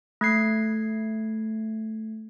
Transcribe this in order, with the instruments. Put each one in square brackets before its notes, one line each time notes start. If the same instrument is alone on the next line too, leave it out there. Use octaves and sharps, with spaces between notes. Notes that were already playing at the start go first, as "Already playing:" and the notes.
[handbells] A3 G#6 C7